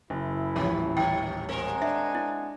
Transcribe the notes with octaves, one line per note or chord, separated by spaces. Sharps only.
F#1 E4
D#1 A1 F3 C#4
D#3 C#5 G5
G#3 C4 A#4 F#5 G#5
D4 E5
E4